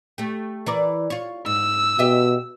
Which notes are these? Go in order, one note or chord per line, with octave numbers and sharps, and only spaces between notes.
A3 G4
E3 A#4 D5
F4 C#5
G#2 E6
B2 G4 D#5 E5